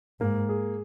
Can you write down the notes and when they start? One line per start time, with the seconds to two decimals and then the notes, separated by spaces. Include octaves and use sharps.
0.20 G#2 A#3
0.49 G#4